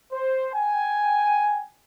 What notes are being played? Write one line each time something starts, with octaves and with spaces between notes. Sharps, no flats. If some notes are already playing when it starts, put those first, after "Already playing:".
C5
G5 G#5